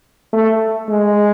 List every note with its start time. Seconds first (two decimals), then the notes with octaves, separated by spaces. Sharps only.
0.33 A3
0.89 G#3